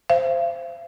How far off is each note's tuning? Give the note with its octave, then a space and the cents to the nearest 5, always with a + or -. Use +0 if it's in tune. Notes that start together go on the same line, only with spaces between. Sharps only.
C5 +0 F5 -45